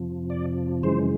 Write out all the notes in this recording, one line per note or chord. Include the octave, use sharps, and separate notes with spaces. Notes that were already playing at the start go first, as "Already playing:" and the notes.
Already playing: F2 C3 F3
D5
F#2 C#3 E3 G#3 C5